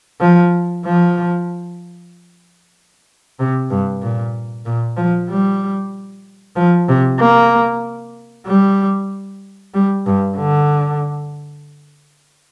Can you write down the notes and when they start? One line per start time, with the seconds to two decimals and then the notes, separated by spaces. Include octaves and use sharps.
0.20 F3
0.85 F3
3.39 C3
3.70 G2
4.02 A#2
4.65 A#2
4.97 F3
5.29 G3
6.56 F3
6.88 C3
7.19 A#3
8.46 G3
9.74 G3
10.06 G2
10.37 D3